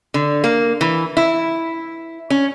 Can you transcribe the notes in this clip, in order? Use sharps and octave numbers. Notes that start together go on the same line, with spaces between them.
D3
A#3
E3
E4
C#4